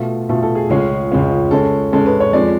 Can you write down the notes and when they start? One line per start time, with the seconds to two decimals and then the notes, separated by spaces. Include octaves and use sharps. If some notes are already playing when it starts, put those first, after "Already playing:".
Already playing: B2 A3 F4
0.29 B2 A3 F4 A4
0.42 A4
0.55 G#4
0.69 C#2 C#3 G#3 C#4 F4 G#4
1.11 C#2 C#3 G#3 C#4 F4
1.51 C#3 G#3 C#4 A4
1.92 C#3 G#3 C#4 A4
2.06 B4
2.20 C#5
2.33 F2 F3 G#3 D5